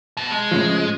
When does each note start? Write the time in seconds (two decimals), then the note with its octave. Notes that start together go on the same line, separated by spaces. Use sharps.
0.17 B2
0.31 G#3
0.51 A2 C#3 F3